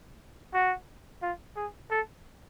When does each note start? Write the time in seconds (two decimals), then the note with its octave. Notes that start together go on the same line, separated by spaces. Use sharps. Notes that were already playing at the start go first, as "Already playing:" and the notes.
0.54 F#4
1.22 F4
1.56 G#4
1.91 A4